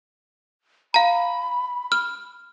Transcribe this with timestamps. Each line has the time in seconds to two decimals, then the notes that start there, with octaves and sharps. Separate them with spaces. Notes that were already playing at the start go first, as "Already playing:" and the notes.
0.94 F5 A#5 B5
1.92 F6